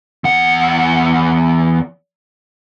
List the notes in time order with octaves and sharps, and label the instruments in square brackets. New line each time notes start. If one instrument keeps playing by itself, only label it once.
[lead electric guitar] E2 F#5